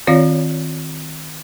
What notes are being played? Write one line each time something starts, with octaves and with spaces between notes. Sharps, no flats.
D#3 C4 F4 C#5 D5 F5